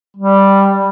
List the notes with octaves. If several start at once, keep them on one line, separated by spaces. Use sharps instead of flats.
G3